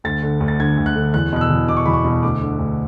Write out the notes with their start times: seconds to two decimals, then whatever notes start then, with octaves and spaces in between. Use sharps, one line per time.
0.04 D2 A6
0.23 D3
0.40 D2
0.48 A6
0.60 D3 G#6
0.78 D2
0.86 F#6
0.96 D3
1.14 E2 F#6
1.32 B2 F#6
1.41 E6
1.50 E2
1.68 B2 D6
1.77 C#6
1.86 E2 B5
1.93 C#6
2.05 B2
2.23 D2 D6
2.41 D3
2.59 D2